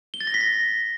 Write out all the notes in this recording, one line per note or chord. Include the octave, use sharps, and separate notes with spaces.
G7
A6
A#6
B6
A#6